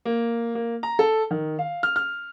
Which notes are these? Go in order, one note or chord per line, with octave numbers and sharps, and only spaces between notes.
A#3
A#3
A#5
A4
D#3
F5
F6
F6